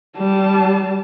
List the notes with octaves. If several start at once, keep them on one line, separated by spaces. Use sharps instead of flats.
G3 A5